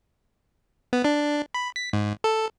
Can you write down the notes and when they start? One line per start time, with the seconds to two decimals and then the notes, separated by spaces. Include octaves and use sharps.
0.93 B3
1.04 D4
1.54 B5
1.76 B6
1.93 G#2
2.24 A4